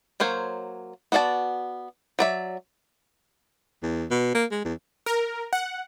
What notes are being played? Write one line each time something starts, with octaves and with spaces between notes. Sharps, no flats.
F#3 A#3 C5 C#5
B3 F#4 D5 F5 A5
F#3 D5 E5
E2
B2
A#3
G#3
E2
A#4
F#5